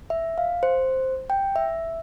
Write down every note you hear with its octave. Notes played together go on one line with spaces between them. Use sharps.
E5
F5
C5
G5
E5